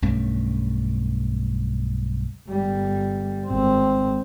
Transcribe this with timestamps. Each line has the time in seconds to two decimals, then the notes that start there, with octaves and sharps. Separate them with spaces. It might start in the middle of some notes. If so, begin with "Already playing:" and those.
0.02 B1 G2 A3 C#4
2.49 G1 G3
3.46 G#1 C4